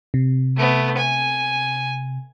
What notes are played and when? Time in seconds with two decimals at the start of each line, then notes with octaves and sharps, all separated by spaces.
0.14 C3
0.56 A3 B3
0.97 G#5